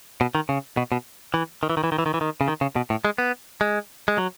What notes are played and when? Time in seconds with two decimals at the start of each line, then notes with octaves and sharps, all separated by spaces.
0.21 B2
0.35 D#3
0.49 C#3
0.77 B2
0.92 B2
1.34 E3
1.63 D#3
1.70 E3
1.77 D#3
1.84 E3
1.92 D#3
1.98 E3
2.06 D#3
2.14 E3
2.21 D#3
2.41 C#3
2.48 D#3
2.61 C#3
2.76 B2
2.90 A2
3.05 G#3
3.18 B3
3.61 G#3
4.08 G#3
4.18 F#3